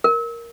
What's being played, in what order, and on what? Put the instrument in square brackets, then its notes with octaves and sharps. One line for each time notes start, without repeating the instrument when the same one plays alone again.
[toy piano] A#4